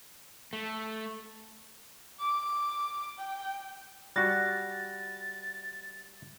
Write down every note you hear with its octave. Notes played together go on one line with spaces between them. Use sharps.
A3
D6
G5
G3 F#4 F#6 A6 A#6